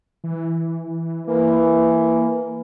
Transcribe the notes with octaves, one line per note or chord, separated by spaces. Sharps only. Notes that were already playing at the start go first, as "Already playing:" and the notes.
E3
E3 A#3